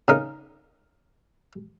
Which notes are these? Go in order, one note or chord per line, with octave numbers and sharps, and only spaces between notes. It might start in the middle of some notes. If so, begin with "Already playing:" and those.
C#3 D#4 A#4